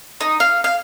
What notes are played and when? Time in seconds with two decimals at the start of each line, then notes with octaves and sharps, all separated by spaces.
0.21 D#4
0.40 F5
0.64 F5